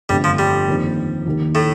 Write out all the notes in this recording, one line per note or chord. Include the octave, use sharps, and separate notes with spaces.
G1 F2 D3 G3 A3
F3
G3
F2 D#3 A#3
D#2 D#3 A#3
A2 A3